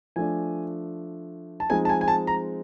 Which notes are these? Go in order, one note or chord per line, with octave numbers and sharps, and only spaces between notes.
F3 A3 D4 G#5
A5
F3 G#3 C4 D#4 G#5
A5
G#5
G#5
A5
A#5